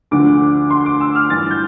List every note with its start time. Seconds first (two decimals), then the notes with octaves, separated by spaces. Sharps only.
0.11 D2 D3 F3 D6
0.70 C6
0.86 D6
1.01 E6
1.15 F6
1.30 G2 E3 A6
1.51 G6